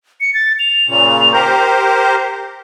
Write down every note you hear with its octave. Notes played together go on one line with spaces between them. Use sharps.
C#7
A6
F7
A#2 C#3
G4 A#4 C5 G6